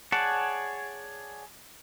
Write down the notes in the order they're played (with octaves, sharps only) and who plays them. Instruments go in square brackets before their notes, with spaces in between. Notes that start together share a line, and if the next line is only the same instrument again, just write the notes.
[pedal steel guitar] G#4 C#5 D5 F#5 A5